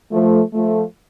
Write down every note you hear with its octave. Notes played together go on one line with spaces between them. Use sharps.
F3 A3
F3 A3